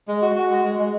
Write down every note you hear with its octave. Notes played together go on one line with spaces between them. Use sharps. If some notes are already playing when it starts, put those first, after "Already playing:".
G#3
F#4
F#4
G#3
G#3
G#3